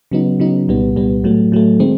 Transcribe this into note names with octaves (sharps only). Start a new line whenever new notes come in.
C#3 F#3 B3 D#4
C#3 F#3 B3 D#4
C2 A#2 G3 B3
C2 A#2 G3 B3
A2 F#3 A3
A2 F#3 A3
D#3 G#3 C4